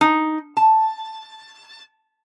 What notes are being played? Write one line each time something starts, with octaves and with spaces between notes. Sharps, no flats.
D#4
A5